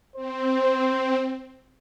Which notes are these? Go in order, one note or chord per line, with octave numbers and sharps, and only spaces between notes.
C4 C5